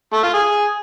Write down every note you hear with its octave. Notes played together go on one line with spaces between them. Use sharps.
A3
F4
G#4